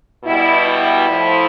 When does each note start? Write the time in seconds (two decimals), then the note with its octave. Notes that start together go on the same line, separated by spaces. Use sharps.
0.24 B2 G3 E4
0.67 E4
1.08 A2 F3